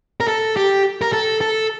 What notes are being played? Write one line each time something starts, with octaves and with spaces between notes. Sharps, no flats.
A#4
A4
G4
A#4
A4
A4